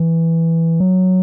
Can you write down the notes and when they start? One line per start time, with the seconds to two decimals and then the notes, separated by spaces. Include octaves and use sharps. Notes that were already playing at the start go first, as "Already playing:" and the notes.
Already playing: E3
0.80 F#3